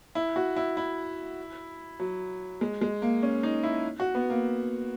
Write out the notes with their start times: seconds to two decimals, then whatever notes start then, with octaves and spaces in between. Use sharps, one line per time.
0.15 E4
0.36 F#4
0.56 E4
0.77 E4
2.00 F#3
2.61 G#3
2.81 G#3
3.02 A#3
3.23 C#4
3.43 D#4
3.63 E4
4.00 F#4
4.15 B3
4.30 A#3